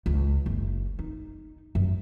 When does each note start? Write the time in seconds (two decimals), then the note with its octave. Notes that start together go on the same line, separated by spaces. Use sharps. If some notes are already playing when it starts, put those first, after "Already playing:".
0.06 C#2
0.46 F#1
0.99 D#4
1.75 F#2